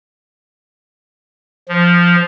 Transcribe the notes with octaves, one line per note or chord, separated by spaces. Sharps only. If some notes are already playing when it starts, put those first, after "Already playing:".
F3